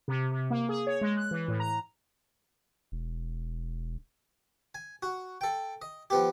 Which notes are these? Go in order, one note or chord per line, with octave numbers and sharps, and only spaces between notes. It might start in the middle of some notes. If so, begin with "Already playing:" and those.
C3
C3
A#3
G#4
C#5
G#3
F#6
E3
A2
A#5
E1
G#5
F#4
A4 G5
D#5
F3 B3 G4